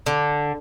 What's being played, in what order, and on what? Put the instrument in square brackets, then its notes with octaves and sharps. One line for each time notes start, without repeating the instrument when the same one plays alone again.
[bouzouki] D3